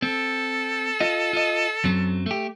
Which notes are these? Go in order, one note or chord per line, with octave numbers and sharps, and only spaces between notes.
C4 A4
F4 D#5
F4 D#5
F#2 F#3 C4
A3 G4